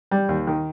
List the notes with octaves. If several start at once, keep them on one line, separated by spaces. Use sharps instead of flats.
G3
D#2
D#3